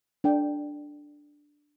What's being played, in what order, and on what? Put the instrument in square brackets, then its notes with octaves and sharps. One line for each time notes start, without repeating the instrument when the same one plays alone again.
[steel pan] D4 A4 D5 G5